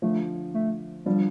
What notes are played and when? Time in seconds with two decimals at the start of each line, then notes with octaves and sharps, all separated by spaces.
0.02 D3 F3 A3
0.54 A3
1.06 D3 F3 G3